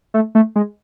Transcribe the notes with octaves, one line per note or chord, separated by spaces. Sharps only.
A3
A3
G#3